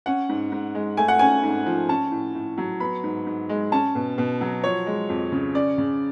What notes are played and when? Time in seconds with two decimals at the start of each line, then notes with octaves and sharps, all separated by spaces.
0.06 C#4 F#5
0.29 G#2
0.52 G#2
0.75 G#3
0.97 A3 G#5
1.08 F#5
1.19 C#4 G#5
1.43 G#2
1.66 F3
1.89 C#4 A5
2.12 A2
2.35 A2
2.58 F#3
2.80 B3 B5
3.04 G#2
3.27 G#2
3.49 G#3
3.72 C#4 A5
3.95 B2
4.18 B2
4.41 F#3
4.64 F3 C#5
4.86 G#3
5.09 F2
5.32 C#3
5.55 C#4 D5
5.78 C#3